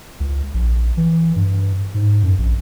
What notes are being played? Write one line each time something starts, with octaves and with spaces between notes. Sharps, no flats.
C#2
A#1
E3
G2
G#2
F#2
A#1